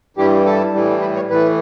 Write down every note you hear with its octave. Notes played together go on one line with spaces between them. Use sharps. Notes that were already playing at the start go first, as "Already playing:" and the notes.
G2 E3 G3 G4
A4
A2 E3 G3
B4
C#5
A2 E3 A3 B4